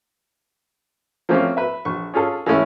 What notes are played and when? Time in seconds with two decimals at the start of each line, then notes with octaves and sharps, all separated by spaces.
1.29 F3 A3 A#3 C4 C#4 F4
1.57 B4 E5
1.85 A#1 C#6
2.14 C#4 F4 G#4 A4
2.46 E3 G#3 A3 C#4 E4